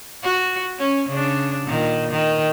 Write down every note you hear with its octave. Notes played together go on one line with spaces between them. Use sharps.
F#4
C#4
C#3 D4
A#2 D#3
D#3